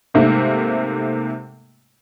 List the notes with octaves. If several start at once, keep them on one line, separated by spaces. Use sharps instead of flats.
G#2 C3 A3 A#3